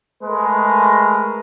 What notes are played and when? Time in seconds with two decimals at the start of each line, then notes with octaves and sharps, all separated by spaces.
0.24 G#3 A3 A#4 B4